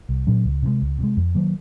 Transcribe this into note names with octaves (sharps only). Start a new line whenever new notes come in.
C2
A#2 F#3 C#4
C#2
C3 D#3 G#3
C#2
C3 D#3 G#3
F2
D#3 F#3 A#3